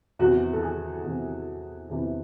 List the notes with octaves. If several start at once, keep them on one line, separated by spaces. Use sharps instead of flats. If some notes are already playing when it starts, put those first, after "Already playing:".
E2 C3 E3 F#4
A4
G#4
E2 C3 E3
E2 C3 E3